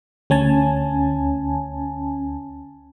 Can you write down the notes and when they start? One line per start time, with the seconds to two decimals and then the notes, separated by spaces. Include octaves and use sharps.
0.30 D2 C#4 G#5 A5